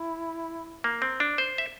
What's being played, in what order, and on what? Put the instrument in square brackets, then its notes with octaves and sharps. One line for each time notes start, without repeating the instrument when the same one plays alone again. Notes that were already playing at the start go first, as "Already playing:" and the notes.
Already playing: [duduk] E4
[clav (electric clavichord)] A#3
C4
D4
C5
E5